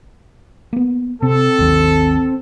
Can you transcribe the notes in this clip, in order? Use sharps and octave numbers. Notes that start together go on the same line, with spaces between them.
A#3 B3
C3 C4 A4
G#1 D#2 D#3